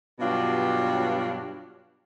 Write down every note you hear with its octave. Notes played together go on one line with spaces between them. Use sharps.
G2 B2 F#3 G3 D4 F4